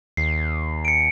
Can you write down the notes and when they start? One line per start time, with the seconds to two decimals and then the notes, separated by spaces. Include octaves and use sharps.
0.17 D#2 C7
0.85 C#7 D7